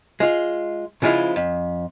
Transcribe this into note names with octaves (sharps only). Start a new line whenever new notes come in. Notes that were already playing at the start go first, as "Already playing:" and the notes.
G#3 F4
C#3 F3 G#3 E4 F4
F2